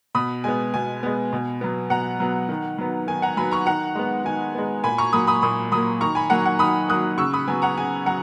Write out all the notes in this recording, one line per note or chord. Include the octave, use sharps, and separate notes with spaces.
B2 B5 D#6
G#3 B3 G#5
B2 G#5
G#3 B3
B2
F#3 B3
B2 F#5 A#5
F#3 B3
D#3
F#3 B3
D#3 G#5
F#5 A#5
F#3 B3 G#5 B5
A#5 C#6
D#3 F#5 A#5
G#3 B3
D#3 G#5
G#3 B3
A#2 G#5 B5
A#5 C#6
F#3 A#3 B5 D#6
B5 D#6
A#2 B5 D#6
F#3 A#3 B5 D#6
D#3 A#5 C#6
G#5 B5
F#3 A#3 F#5 A#5
F#5
D#3 B5 D#6
F#3 A#3 D#6 F#6
C#3 C#6 E6
B5 D#6
F#3 B3 G#5
F#5 A#5
C#3 G#5
F#3 F#5 A#5